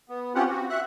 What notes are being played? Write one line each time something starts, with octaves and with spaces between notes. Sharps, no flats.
B3
C4 C#4 F4 G4 F#5
F#4
E5 F#5 F#6